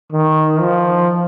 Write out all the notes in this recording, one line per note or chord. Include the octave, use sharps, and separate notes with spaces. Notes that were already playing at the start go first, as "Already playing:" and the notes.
D#3
F3